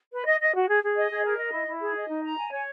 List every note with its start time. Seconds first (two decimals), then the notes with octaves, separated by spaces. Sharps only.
0.12 B4
0.26 D#5
0.40 D#5
0.54 F#4
0.68 G#4
0.83 G#4
0.96 D#5
1.11 G#4
1.25 A#4
1.39 D#5
1.53 E4
1.68 E4
1.81 G#4
1.96 D#5
2.09 D#4
2.24 A#5
2.37 G#5
2.51 C#5